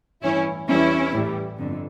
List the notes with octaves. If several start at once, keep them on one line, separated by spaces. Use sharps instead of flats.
A1 G2 E3 C#4 E4
E2 E3 G3 C#4 E4
A1 A2 E3 G3
G1 F2 D3